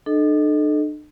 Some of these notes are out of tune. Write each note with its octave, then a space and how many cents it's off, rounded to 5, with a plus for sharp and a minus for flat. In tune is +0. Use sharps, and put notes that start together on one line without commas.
D4 +45 A4 -20 D#5 +0